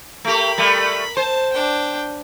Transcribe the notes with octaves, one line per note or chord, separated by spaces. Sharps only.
A3 G4 A#4 B5
G3 A3
C5 A5
D4 G5